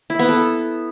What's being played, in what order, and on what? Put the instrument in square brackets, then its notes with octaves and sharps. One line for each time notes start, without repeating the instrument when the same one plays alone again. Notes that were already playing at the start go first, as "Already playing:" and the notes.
[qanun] E4
B3
A4